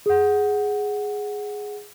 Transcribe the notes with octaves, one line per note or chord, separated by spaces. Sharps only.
G#4 F#5